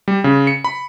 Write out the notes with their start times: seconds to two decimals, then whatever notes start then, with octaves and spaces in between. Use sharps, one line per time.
0.08 G3
0.24 C#3
0.47 C#7
0.64 B5